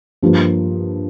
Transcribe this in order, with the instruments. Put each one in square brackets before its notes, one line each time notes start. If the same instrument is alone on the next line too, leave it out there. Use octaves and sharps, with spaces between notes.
[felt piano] G2 F3 A#3 F4